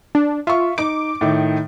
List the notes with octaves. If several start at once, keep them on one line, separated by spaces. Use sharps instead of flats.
D4
F4 E5 C#6
D#4 D6 D7
A2 D#3